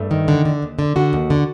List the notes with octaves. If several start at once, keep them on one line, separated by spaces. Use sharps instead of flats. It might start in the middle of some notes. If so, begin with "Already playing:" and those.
Already playing: G2 A3
D#3
D3
D3
D#2
D3
D3 F#4
D#2
D3